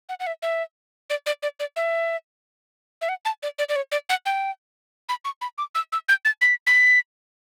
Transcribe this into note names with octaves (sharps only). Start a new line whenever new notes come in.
F#5
F#5
E5
E5
D5
D5
D5
D5
E5
E5
F#5
A5
D5
D5
D5
C#5
D5
F#5
G5
B5
C#6
B5
D6
E6
E6
G6
A6
B6
B6